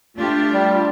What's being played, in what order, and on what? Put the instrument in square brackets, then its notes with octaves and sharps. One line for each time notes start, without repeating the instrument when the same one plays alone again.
[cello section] A3 D4 G4 [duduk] F4
[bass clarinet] G3